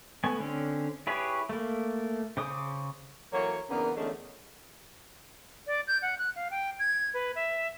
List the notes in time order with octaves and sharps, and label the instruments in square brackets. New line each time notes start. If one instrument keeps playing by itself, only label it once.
[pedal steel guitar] A3 B3 G#5
D3 C4 C#4
E4 G4 G#4 B4 C#5
A3 A#3
C#3 C5 D6 D#6
[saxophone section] E3 F#3 A#3 A4 C#5
E2 C#3 A#3 B3 D4 A#4
E2 D3 G#3 A3 C#4
[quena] D5
G6
F#5
F#6
F5
G5
G#6
B4
E5